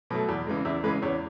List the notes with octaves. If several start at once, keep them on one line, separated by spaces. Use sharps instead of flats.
B2 F#3 A3
E2
C#3 E3 G#3
E2 E4
C#3 E3 G#3 B4
E2 C#5